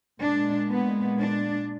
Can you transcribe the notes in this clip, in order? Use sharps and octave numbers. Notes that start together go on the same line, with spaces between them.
A#2 G#3 D4
B3
D4